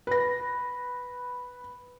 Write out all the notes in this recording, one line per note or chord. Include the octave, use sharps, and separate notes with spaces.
B4 A#6